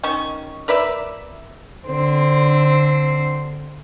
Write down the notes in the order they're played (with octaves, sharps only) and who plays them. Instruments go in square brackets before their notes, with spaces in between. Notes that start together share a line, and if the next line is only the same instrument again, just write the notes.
[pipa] D#3 C#4 C#6
A#4 B4 D5 E5
[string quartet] D3 C4